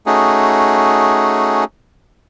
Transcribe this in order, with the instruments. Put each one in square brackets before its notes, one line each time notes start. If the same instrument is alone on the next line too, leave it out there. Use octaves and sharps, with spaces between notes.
[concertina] A3 C#4 D#4 F#4 G#4